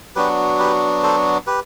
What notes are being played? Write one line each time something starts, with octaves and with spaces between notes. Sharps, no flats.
F#3 B3 D4 F#4 G4 B4
G4 B4
A4 C5
G4 B4